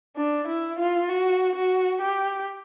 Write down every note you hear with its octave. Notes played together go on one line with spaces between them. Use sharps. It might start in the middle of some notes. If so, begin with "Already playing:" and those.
D4
E4
F4
F#4
F#4
G4